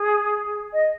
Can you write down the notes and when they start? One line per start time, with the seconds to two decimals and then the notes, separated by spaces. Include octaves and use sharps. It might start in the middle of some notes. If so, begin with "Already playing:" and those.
Already playing: G#4
0.73 D#5